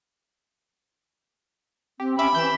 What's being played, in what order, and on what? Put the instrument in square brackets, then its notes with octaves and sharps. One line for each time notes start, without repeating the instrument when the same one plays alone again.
[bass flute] C4 [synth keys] G4
[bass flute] C#4 [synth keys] G4 E5 D6 [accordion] B5
[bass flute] E3 [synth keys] G6 E7